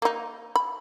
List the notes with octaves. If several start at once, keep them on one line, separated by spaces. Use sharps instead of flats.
A#3 D#4
B5